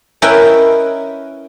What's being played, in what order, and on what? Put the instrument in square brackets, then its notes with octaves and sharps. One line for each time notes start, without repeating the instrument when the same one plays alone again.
[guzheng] C#4 E4 A#4 B4 D#5 G5